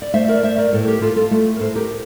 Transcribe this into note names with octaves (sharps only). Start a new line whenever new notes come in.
D5
A3 C5 E5
A#4 D5
A3 C5 E5
A#4 D5
A2 A4 C5
G4 A#4
A2 F4 A4
F4 A4
A3
A#4
A2 A4 C5
G4 A#4